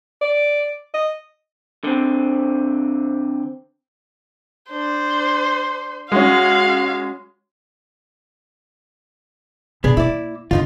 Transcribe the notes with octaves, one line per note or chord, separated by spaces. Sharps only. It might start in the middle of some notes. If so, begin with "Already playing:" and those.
D5
D#5
D3 C4
D4 C5
G#3 C#4 F#4 F5
B2 B3 D4 G#4
A#3 E4 D5
D#2 D3 D#4 F4